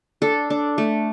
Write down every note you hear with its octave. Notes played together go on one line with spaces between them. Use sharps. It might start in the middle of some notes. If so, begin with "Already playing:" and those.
D4 A4
D4
A3